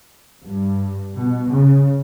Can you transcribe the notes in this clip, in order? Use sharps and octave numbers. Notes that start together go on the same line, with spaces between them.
G2
B2
C#3